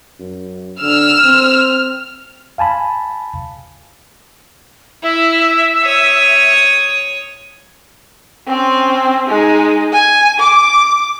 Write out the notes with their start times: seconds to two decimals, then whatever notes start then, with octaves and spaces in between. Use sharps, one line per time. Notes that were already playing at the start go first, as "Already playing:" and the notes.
0.19 F#2
0.81 D3 E6 F6
1.24 C4
2.58 F5 G#5 A5 B5
5.03 E4 E5
5.83 C#5 D#6
8.47 C4 C#4
9.28 G#3 D#4
9.92 G#5
10.40 D6